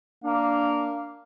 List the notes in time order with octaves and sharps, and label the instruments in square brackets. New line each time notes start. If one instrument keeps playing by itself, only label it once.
[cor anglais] A#3 [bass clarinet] D4 [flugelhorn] F5